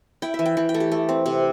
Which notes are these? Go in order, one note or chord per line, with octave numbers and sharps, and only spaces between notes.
E4 G5
E5
E3
G5
E3
G5
A3
G4
A3
C4
C3